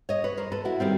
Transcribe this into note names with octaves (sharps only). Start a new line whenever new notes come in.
C#5 D#5
B4 C#5
A#4 C5
A4 B4
E4 F#4
D#3 G3 C4